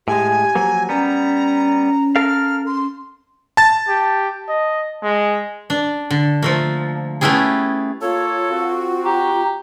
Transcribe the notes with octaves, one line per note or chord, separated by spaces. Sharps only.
A2 G#3 G4 G#5
F3 F#3 A#3
G3 B3 C#4 A#5
A4 A#4 F5 F6
C6
A5 A6
G4
D#5
G#3
D4
D3
F3 A3 A#3
A3 B3 C#4 E4 G4 G#4
A#3 F4 A4 C#5 F5
C4 F#4
G4 A#5